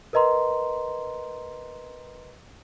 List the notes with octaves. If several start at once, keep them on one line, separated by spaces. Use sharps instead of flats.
A#4 B4 D#5 A#5 C6